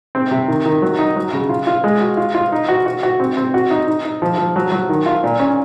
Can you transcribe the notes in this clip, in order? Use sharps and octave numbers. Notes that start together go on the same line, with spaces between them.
C4
C3
D#3
D#3
F#3
D#4
F#3
C#3
F4
F4
G#3
F#4
F4
F4
D#4
F#4
F#4
F#4
C4
C4
F#4
D#4
D#4
D#4
F3
F3
F#3
F#3
D#3
F4
A#2
C#4